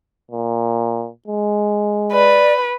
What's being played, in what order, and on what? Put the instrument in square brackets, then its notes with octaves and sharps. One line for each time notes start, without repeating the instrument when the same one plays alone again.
[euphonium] A#2
G#3
[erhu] B4 [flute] D5